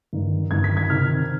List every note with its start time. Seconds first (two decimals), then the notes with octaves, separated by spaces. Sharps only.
0.13 G2 D#3
0.51 G2 D#3 G#6
0.64 B6
0.77 G#6
0.90 C3 D#3 F6